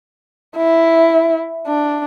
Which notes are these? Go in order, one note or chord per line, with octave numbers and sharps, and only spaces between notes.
E4
D4